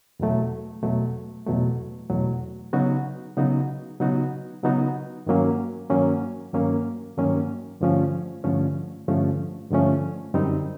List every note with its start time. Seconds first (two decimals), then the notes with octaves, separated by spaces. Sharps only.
0.20 E2 B2 F#3 A3
0.83 E2 B2 F#3 A3
1.47 E2 B2 F#3 A3
2.10 E2 B2 F#3 A3
2.73 C#3 F#3 B3 D#4 F#4
3.37 C#3 F#3 B3 D#4 F#4
4.00 C#3 F#3 B3 D#4 F#4
4.63 C#3 F#3 B3 D#4 F#4
5.26 G2 D#3 F#3 A#3 C#4
5.90 G2 D#3 F#3 A#3 C#4
6.53 G2 D#3 F#3 A#3 C#4
7.17 G2 D#3 F#3 A#3 C#4
7.81 G2 D3 F3 A3 C#4
8.44 G2 D3 F3 A3 C#4
9.08 G2 D3 F3 A3 C#4
9.71 G2 D3 F3 A3 C#4
10.34 F#2 D3 G3 C4 D#4